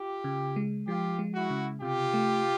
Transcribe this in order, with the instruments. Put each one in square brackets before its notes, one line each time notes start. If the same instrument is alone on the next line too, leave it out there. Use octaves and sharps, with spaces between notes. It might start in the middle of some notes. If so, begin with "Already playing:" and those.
Already playing: [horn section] F4 G4
[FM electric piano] C#3
G#3
[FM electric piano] F3 [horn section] F4 G4
[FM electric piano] G#3
[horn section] E4 F#4
[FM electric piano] C#3
[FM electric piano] C3 [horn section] F4 G4
[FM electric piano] A3